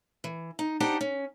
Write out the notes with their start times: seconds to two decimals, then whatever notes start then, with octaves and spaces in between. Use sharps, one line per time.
0.24 E3
0.59 D#4
0.80 D4 D#4 G4 C5 F#5
1.01 C#4